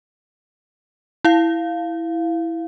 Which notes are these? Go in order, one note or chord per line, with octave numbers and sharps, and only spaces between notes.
E4 F5